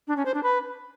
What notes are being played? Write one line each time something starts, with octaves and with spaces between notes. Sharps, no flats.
D4
C#4
C5
D4
B4